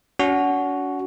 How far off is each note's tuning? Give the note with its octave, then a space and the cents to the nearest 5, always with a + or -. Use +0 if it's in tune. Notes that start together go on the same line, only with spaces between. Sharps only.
C#4 +45 F#4 +5